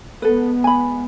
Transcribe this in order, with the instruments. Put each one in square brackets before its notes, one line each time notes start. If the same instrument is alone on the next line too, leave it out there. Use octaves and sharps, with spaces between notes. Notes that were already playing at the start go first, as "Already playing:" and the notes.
[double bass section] G#3 B3 [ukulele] A4 B4
[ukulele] G#5 B5